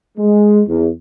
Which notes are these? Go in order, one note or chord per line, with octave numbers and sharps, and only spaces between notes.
G#3
E2